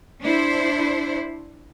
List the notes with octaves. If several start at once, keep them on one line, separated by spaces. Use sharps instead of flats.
D4 E4 C5